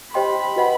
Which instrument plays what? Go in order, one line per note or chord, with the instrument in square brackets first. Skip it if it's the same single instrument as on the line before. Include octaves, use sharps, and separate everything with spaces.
[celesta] G4 C5 D#5 G5 C6 [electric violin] B5
[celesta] F#4 B4 D#5 F#5